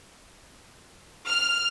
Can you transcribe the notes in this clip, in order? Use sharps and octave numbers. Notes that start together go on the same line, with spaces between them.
F6